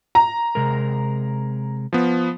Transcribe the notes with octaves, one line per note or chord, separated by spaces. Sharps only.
A#5
C3 G#3 A#4
F3 B3